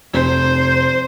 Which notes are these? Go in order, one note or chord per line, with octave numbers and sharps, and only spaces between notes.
F1 C5